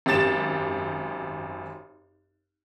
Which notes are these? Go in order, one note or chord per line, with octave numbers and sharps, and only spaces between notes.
G#1 F#2 G4 A6 E7